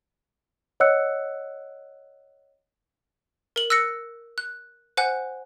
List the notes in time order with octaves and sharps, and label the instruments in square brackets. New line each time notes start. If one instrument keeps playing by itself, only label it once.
[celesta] C#5 D#5 F#5 E6 F#6 C#7
[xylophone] A#4 F#7
E6 F#6 A#6 C#7
F#6
C5 F#5 G#5 F#6